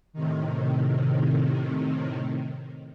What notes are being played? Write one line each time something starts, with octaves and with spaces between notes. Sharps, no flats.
A2 C3 D#3